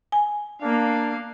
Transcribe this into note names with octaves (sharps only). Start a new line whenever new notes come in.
G#5
A#3 D4 F5